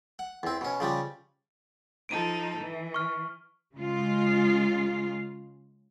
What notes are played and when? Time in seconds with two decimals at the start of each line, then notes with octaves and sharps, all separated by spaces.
0.19 F#5
0.43 E2 C4
0.61 B2 C#4
0.80 C#3 F3 G3
2.09 F3 D#4 A4 D7 D#7
2.61 E3
2.94 C#6 F6
3.75 C#3 G#3 F4